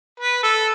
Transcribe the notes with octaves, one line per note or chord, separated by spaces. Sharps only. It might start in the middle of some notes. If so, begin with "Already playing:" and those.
B4
A4